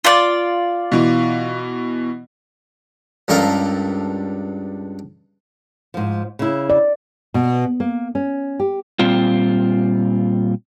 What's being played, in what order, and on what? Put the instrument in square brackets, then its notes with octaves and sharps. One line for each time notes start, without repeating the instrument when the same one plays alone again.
[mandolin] F4 D5
[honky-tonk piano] B2 E3
[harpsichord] C#2 G2 A4 A#4 F5
[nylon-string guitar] G#2 F3
C#3 E4
[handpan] D5
[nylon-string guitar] B2
A#3
C#4
G4
[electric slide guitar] A#2 G3 C4 F4